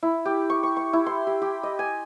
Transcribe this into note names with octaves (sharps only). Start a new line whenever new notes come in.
E4
G4
C#6
C#6
C#6
E4
C6
G4
G4
D#5
G#5